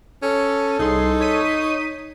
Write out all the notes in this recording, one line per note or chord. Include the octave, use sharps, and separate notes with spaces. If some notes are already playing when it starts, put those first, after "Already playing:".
C#4 A4
C2 D#4 G#4 C6
C#5 B6 D#7